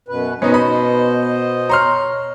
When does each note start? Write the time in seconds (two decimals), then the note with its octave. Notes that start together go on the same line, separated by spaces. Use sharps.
0.08 F#2 B2 B4
0.42 B2 B3 C#4 D#4 C5 D#5
0.54 B5
1.69 C#5 A#5 C6 F6